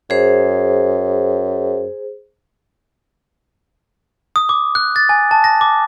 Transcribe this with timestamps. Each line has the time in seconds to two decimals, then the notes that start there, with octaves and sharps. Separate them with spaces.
0.10 F#2 G#4 C5
4.36 D#6
4.49 D6
4.75 F#6
4.96 A6
5.09 G#5
5.31 A5
5.44 A#6
5.61 D6